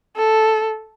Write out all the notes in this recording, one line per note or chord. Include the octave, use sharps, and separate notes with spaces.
A4